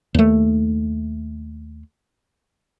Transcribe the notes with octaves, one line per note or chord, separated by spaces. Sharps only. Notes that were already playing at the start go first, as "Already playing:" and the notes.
D#2 A3